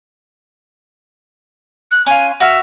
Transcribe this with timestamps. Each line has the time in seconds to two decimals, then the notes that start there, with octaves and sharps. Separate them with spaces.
1.91 F#6
2.06 C#4 F4 G#5
2.40 F#4 E5 F6